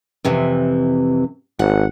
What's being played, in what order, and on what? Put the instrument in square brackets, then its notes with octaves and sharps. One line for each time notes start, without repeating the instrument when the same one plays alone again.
[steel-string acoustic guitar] F2 C3 E3
[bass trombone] G#1 [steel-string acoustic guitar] F#5